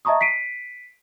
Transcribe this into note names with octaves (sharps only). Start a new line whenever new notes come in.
D#5 E5 A5 A#5 C#6 D#6
B6 C7 D7 D#7